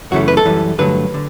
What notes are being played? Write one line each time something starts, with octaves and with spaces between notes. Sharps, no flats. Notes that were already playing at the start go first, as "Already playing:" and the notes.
F#2 C#3 E3 A3 F#4
B4
A4
F#2 E3 G3
G2 D3 F#3 A3 B4
D3